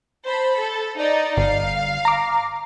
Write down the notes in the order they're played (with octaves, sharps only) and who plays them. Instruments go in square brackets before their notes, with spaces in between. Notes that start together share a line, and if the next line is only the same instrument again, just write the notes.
[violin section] C5 A5 B5
A4
D#4 D5 D#5
[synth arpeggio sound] G1 [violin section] F5
[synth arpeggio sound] A#5 D6